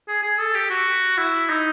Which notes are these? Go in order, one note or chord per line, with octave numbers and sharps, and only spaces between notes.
G#4
G#4
A4
G4
F#4
E4
D#4